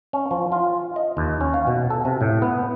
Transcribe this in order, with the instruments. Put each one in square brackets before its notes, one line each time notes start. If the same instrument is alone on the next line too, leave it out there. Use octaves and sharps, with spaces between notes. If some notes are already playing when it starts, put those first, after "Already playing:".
[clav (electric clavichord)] C#4
F3
F4
D#5
D#2
C#4
F5
B2
A4
C3
A2
B3